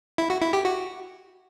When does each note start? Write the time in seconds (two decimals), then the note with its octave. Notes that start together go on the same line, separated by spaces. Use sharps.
0.18 E4
0.30 F#4
0.42 E4
0.53 G4
0.65 F#4